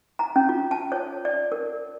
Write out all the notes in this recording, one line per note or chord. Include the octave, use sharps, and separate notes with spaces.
A#5
C#4
F4
A5
C#5
D5
A#4